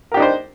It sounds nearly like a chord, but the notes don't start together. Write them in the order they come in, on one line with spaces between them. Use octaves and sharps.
A#4 G4 D4 D#4 C5